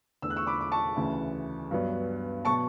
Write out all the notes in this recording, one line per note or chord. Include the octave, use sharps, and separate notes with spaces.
E2 D3 A3 E6
F#6
C#6 E6
B5 D6
D6
A5 C#6
D2 C#3 E3
G2 F#3 B3
B2 F#3 B3 A5 C#6